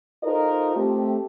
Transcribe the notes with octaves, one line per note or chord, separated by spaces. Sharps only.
D#4 F4 A4 A#4 C5 D#5
A3 C4 G4